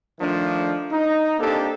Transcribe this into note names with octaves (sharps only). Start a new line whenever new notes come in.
D#3 F3 A3 D4
D#4
A#3 C4 D4 D#4 G4 A4